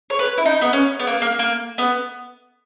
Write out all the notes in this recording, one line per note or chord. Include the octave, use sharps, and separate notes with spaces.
C#5
B4
E4
D#4
B3
C#4
B3
A#3
A#3
A#3
B3